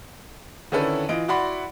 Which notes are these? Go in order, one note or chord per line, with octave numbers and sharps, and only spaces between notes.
D3 D#3 C#4 E4 A4 B4
E3 F4 D#5 D7
E4 F#4 D5 F#5 B5 C6